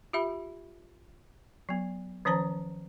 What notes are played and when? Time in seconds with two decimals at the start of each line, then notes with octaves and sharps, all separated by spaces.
0.13 F4 G4 E5 B5
1.69 F#3 B3
2.25 D#3 F3 C#4 C5 A5 A#5